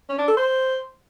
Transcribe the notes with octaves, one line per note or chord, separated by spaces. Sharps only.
C#4
D4
A4
C5